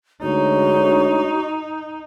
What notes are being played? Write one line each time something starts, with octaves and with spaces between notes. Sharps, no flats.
D2 G#3 D#4 F#4 C#5